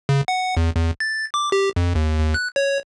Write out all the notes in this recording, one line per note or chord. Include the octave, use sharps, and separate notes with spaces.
C#3
F#5
E2
E2
A6
D6
G4
F2
D#2
D#2
F#6
C#5